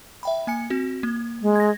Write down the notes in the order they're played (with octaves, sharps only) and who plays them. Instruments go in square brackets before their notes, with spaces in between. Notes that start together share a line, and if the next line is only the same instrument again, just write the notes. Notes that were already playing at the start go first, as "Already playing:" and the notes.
[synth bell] E5 G5 B5
A#3 G#5 C#7
C4 F#4
A#3
[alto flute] G#3
[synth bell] G#6 A#6